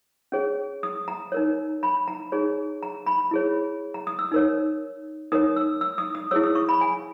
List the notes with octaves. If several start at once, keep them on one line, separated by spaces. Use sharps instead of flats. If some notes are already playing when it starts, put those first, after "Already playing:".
C#4 G#4 C#5
D#6
A#5
D#4 A#4 C#5
B5
A#5
D#4 G#4 C#5
A#5
B5
E4 G#4 C#5
A#5
D#6
E6
D#4 A#4 C#5
D#4 A#4 C#5 D#6
E6
E6
D#6
D#6
E4 G#4 C#5 E6
D#6
C#6
B5
G#5